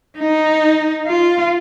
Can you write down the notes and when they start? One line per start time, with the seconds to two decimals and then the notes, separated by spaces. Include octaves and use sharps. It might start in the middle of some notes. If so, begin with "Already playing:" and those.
0.19 D#4
1.07 F4